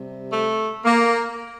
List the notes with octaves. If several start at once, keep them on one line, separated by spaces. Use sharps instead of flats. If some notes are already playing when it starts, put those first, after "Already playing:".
Already playing: C3 G3
A3
A#3